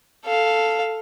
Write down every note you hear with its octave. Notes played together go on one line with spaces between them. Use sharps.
A4 F5